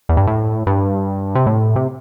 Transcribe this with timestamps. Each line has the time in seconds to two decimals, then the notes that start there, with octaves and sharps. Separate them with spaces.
0.09 E2
0.17 G2
0.27 A2
0.66 G2
1.35 C3
1.47 A2
1.76 C3